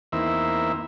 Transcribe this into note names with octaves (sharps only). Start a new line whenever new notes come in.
E2 D#3 A#3 C4 E4 E5